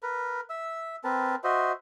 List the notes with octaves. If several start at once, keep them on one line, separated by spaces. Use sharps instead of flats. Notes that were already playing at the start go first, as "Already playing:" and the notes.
A#4 B4
E5 E6
C4 A#4 B4 A5
F#4 C5 D#5 E5